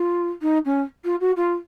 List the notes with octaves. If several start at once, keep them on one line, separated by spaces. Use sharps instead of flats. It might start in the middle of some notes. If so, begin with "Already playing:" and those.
Already playing: F4
D#4
C#4
F4
F#4
F4